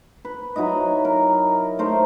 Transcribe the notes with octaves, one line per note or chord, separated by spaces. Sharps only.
B4
F#3 D#4 E4 D#5
A#4
A3 D#4 A#4 C5